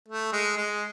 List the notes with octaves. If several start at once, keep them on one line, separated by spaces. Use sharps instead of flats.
A3
G#3
G#3